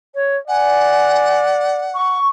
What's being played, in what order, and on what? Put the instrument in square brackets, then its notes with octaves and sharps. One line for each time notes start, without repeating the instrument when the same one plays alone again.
[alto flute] C#5
[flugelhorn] D5 [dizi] F#5 [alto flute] G#5
[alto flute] C#6